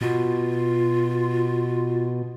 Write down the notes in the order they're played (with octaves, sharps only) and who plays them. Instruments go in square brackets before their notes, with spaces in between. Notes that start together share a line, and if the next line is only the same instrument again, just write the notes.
[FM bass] B2 [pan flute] F4